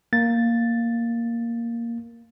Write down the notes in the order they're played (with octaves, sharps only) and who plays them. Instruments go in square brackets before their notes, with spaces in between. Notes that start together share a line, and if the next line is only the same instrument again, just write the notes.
[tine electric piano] A#3 A6